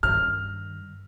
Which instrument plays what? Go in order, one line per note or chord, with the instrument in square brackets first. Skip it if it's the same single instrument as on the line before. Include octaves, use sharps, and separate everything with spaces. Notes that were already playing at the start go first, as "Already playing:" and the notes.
[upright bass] G2 D#3 [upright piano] F6